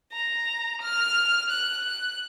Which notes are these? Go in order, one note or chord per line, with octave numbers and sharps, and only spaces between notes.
A#5
F6
F#6
F#6